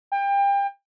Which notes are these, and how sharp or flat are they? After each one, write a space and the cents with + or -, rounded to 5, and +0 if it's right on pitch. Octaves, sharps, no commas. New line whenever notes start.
G5 +30